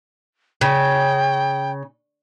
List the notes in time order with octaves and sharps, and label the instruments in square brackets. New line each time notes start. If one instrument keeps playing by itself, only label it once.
[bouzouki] C#3 [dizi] G5